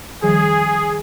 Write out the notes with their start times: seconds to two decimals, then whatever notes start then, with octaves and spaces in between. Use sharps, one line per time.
0.23 D#3 F3 G3 G#4